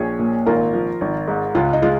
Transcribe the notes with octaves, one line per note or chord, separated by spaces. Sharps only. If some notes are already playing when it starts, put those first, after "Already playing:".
Already playing: A#1 F3 G#4 C#5
A#2
G#1 F4 A#4
F3
G#1
G#2
C#2 F4
D#4
G#3 F4